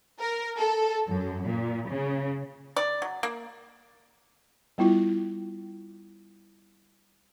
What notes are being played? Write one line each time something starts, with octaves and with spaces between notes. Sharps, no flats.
A#4
A4
F#2
A#2
C#3
D5
F#3
A#3
G3 B3 E4 F4